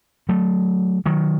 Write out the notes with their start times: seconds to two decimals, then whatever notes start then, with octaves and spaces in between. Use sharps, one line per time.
0.29 F#3 A3
1.06 D#3 F#3